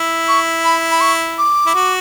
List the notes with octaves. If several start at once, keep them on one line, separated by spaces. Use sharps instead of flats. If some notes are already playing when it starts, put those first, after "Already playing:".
Already playing: E4
C#6
B5
B5
C#6
D6
E4
F#4